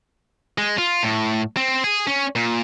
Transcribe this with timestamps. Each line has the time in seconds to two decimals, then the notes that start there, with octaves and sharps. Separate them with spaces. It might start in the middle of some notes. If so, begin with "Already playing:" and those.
0.58 G#3
0.78 F4
1.03 A2
1.57 C4
1.84 G#4
2.07 C#4
2.36 A#2